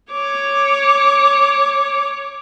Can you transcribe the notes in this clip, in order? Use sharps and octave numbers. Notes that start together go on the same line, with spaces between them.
C#5 D6